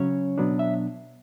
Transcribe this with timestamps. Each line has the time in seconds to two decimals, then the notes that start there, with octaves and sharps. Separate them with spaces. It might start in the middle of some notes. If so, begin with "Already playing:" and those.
Already playing: C#3 F#3 C#4 C#5
0.38 B2 F#3 B3 D4
0.59 E5